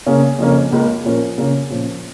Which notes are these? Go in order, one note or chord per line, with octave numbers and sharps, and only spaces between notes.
C#3 A#3 C#4 G#4
F2 C#3 A#3 C#4
C#2 C#3 A#3
A#2 F3 C#4 A#4
C#3 A#3 C#4
A#2 F3 C#4